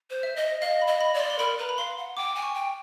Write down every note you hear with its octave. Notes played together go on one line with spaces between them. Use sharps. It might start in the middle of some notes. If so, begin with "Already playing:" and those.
C5
E5
D#5
D#5 F5
B5
D#5
B5
D5
C6
C6
A#4 B5
B4 A#5
B5
F5 C6
F#5
G5 D6
G#5
C#6
G5